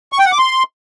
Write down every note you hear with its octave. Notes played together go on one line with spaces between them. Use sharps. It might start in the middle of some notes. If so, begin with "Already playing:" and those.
C#6
G5
F#5
D6
C6